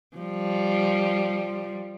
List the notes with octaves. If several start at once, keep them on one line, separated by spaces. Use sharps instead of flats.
F3 G3